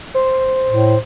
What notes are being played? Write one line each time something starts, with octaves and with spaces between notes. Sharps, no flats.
C5
A2